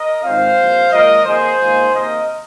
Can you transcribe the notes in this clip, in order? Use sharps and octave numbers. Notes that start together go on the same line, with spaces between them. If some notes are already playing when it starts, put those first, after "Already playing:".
Already playing: A#4 D#5
G#2 D#3 G#3 C4 F4 C5 F5
C2 A#2 F3
A#2 F3 G#3 A#4 D#5
F2 D#3 A#3 G#4 C5
D#2 D#3 G#3 F4
C3 D#3 A#3 A#4 D#5